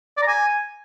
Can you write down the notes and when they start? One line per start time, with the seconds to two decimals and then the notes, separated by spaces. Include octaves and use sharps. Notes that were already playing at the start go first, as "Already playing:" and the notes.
0.17 D5
0.22 A#5
0.28 G#5